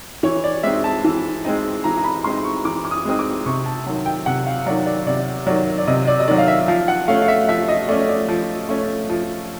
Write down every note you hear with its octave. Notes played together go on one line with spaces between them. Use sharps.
E3 C#5
D5
G#3 C4 D#4 E5
A5
E3
G#3 C4 D#4
E3 A#5
A#5
B5
G#3 C4 D#4 C6
C#6
E3 D6
D6
D#6
G#3 C4 D#4 D#6
D6
C3 C#6
A5
D#3 F#3
G5
C3 F#5
F5
D#3 F#3 D5
D5
C3 D5
D#3 F#3 D5
D5
C3 D#5
D5
D#5
D#3 F#3 D5
F5
E5
F3 F5
F#5
A3 C#4 F5
F5
E5
F3 E5
D#5
A3 C#4 D5
D5
F3
A3 C#4
F3